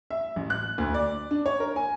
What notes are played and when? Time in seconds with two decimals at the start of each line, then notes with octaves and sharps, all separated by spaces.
0.10 E5
0.36 A1
0.50 F#6
0.78 D2
0.94 D5
1.31 D4
1.46 C#5
1.60 A#4
1.76 G#5